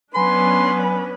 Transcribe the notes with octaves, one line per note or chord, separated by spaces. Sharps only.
F#3 B3 C#4 D4 B4 G#5 B5 C6